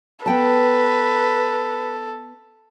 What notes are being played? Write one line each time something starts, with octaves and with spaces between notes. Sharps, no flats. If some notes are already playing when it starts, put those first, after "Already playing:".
B3 A4 B4 G5 A5